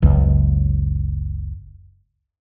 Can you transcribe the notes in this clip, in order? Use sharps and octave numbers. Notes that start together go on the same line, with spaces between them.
F#1 C#2